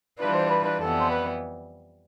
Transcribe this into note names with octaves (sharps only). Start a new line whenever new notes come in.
E3 G3 D4 F4 B4
C5
B4
B4
F2 E3 G3 B3 A4
C5
B4